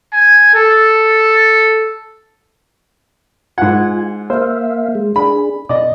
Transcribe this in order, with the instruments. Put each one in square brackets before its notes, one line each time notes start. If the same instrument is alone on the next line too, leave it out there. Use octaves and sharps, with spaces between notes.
[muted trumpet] G#5
A4
[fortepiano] G#2 F#5 [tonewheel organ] F4 G#5
[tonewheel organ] A#3 E5 F5 [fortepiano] C5
[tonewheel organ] G#3
[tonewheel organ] D4 G#4 [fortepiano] B5
[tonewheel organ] B2 [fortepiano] D5 D#5